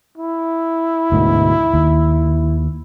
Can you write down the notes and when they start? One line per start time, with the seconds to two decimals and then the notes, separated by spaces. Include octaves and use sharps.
0.18 E4
1.12 D2 G#2 B2
1.74 D#2